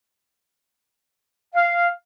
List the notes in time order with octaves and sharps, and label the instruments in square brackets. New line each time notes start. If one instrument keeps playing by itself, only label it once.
[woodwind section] F5